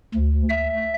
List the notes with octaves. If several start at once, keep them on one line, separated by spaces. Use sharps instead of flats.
D2
E5